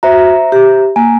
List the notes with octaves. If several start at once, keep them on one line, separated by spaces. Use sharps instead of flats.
F#4 C5 E5 A#5
G4
A#3 G#5